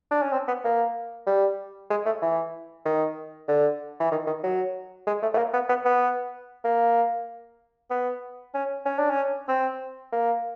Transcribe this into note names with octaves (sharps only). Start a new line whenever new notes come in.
D4
C#4
C4
B3
A#3
G3
G#3
A3
E3
D#3
D3
E3
D#3
D#3
F#3
G#3
A3
A3
A#3
B3
B3
B3
A#3
B3
C#4
C#4
D4
C#4
C4
A#3